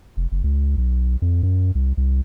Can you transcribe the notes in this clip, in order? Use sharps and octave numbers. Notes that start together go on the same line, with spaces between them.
F1
F#1
C#2
B1
F2
F#2
C2
C2